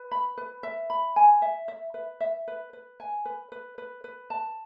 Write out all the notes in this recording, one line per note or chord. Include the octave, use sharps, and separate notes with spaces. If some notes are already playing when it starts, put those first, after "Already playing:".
Already playing: B4
B5
B4
E5
B5
G#5
E5
E5
B4
E5
B4
B4
G#5
B4
B4
B4
B4
A5